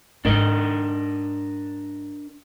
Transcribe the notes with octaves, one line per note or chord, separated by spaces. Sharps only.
G#2 D4 D#4 A#4 D#5